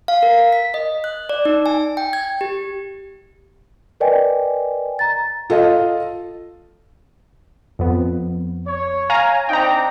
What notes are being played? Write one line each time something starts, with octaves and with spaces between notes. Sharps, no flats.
F5
A#4
B6
D#5
F#6
D5
D#4
G#5
G5
G#6
G4
A#4 B4 D5 D#5 G5 G#5
A#5 A6
F4 A4 D#5 F5
F2 B3
C#5
F5 G#5 A#5
C4 D4 D#4 G5 A#5